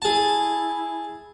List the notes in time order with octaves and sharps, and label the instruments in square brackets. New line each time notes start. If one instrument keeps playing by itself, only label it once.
[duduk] E4 [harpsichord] G#4 A5